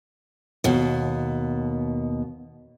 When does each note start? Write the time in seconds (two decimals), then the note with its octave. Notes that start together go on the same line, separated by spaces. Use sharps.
0.64 D#2 B2